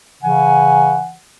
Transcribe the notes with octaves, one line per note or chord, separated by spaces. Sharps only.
C#3 E3 F#5 G#5